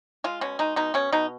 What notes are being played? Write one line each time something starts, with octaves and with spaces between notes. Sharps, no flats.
G#3 F4
B2 C#4
G#3 D#4
B2 D#4
B2 C#4
B2 D#4